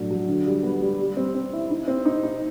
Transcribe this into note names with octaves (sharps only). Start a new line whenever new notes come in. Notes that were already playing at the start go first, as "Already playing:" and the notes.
Already playing: A2 F#3 D4
F#3
D3
G3
B3
G3
G3
C4
C4
E4
D#4
C4
D#4
D#4